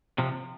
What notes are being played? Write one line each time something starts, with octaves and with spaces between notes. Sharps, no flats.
C3 F3